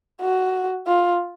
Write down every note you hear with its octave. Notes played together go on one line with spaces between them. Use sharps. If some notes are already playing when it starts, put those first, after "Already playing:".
F#4
F4